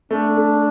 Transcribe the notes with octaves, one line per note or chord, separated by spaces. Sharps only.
A3 D4
A3